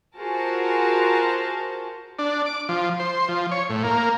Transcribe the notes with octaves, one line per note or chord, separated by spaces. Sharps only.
F4 F#4 G#4 A#4 C5 A5
D4
D6
F3
C5
F3
C#5
A2
A#3